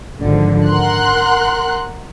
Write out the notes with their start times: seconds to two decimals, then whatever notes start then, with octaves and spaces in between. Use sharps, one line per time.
0.22 G#1 D3 F3
0.69 A#4 F#5 C6 F#6